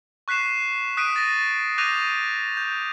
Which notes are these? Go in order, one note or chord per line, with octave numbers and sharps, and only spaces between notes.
C#6 F#6 B6 C7 E7
D#6 F#6 B6 D7 D#7
A6 A#6
D6 F#6 G6 A#6 D#7 F7
G6